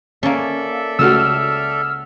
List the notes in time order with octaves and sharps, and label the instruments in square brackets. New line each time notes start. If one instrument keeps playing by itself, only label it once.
[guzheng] A#3 C#4 [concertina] A4 D5 E5
[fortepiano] C#2 A3 F#4 [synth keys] E6 F6